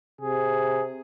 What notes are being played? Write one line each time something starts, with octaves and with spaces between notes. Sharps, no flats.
C3 G#4